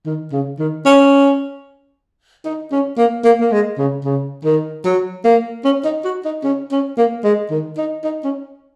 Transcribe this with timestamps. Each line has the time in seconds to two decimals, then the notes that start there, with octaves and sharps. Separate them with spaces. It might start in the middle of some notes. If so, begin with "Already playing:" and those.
0.06 D#3
0.32 C#3
0.59 D#3
0.85 C#4
2.45 D#4
2.72 C#4
2.98 A#3
3.24 A#3
3.40 A#3
3.52 G#3
3.78 C#3
4.04 C#3
4.44 D#3
4.85 F#3
5.24 A#3
5.64 C#4
5.85 D#4
6.05 F#4
6.25 D#4
6.44 C#4
6.72 C#4
6.98 A#3
7.24 G#3
7.51 D#3
7.78 D#4
8.04 D#4
8.24 C#4